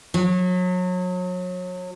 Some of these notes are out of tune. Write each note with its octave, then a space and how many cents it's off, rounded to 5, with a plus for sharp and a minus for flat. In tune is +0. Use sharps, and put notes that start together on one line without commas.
F#3 -30